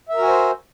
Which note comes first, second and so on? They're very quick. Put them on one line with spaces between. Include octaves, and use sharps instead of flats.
E5 A#4 F#4 G#5 C5